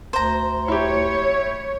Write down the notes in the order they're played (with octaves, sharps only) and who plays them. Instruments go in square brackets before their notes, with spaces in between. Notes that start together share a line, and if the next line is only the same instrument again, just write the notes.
[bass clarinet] D2 [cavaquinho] C5 A#5
[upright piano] E4 G4 [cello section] C#5